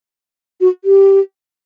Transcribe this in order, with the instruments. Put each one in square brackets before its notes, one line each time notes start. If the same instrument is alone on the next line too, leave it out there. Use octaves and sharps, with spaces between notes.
[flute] F#4
G4